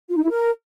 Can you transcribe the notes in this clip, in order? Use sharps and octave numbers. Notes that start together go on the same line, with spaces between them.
F4
D#4
E4
A#4